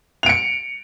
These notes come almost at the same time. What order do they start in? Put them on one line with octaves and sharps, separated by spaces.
F7 D7 C#7